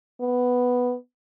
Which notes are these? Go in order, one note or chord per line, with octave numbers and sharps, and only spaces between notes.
B3